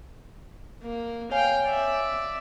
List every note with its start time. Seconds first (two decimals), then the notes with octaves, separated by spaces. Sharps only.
0.83 A#3
1.31 C#5 F5 G5 G#5
1.65 D5 E5